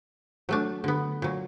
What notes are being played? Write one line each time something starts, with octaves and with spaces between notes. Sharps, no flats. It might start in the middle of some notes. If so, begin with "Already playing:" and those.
F#3 A3 D4
D3 B3
A#2 F#3